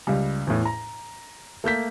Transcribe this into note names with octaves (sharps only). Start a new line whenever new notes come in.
C#2 G3
E2 A2
A#5
A3 A#3 G6 B6